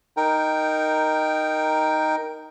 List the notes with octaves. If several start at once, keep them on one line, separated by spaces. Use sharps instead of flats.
D#4 A#4 G5